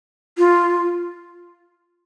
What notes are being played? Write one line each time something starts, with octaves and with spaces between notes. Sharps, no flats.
F4